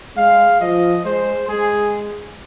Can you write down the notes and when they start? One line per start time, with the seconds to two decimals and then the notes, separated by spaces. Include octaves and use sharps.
0.16 G#3 F5
0.61 F3 D#5
1.05 G#3 C5
1.48 G#3 G#4